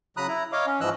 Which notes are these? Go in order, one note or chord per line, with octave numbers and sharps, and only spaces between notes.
C#3 F#3 A#5 B5 D#6 F#6
E4 A#5
C#5 D#5 F5 D6
C#4
G#2 E3 F3 D#5 E6 F#6